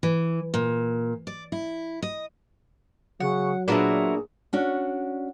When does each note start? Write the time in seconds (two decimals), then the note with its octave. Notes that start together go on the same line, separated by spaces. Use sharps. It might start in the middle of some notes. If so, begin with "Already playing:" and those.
0.03 E3
0.54 A#2
1.27 D5
1.52 E4
2.02 D#5
3.20 C#3 F#3 F#5
3.68 A#2 B3 D4 E4 F#4 G#4 A#4
4.53 C#4 D4 F#4